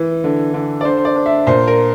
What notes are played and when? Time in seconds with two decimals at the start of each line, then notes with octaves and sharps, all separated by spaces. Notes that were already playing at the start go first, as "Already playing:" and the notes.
Already playing: E3
0.24 D3
0.54 D3
0.81 D5
0.85 D3 C5
0.97 C5
1.05 D5
1.16 D4
1.26 E5
1.47 A#2 C5
1.67 A#4